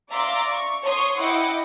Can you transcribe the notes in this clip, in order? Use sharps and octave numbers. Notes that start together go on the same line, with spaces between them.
D5 E5 F5 A#5 C6 D6
C#6
C#5 C6 C#6 D#6
E4 D#5 F#5 G5 D6 C#7